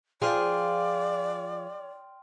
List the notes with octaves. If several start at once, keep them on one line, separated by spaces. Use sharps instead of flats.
F3 G#4 D5 F5 G5 C6 F6